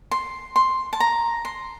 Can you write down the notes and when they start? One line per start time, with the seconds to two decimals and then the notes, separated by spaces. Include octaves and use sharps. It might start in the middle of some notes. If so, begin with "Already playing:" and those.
0.11 C6
0.56 C6
0.93 A5
1.00 A#5
1.45 C6